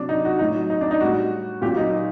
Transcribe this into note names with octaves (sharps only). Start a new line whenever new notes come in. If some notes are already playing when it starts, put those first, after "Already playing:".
Already playing: C3 F#3 D4
D#4
F#4
A2 F#3 D#4
D#4
D4
D#4
A2 G3 F#4
A#2 F#3 G4
D#4